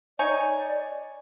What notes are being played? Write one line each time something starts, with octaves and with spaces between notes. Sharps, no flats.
D#4 C#5 D5 G#5